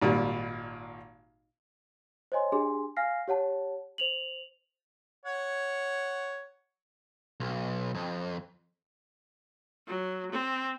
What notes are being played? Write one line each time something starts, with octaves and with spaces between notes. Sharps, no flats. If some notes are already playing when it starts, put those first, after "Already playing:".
G#1 A#2 G3
C5 C#5 D#5 G#5 C6
D4 G4 G#4 G#5 C6
F5 G#5 F6 A#6 C7
G4 C#5 F#5 A5
C5 F7 F#7
C#5 F#5
B1
F2
F#3
C4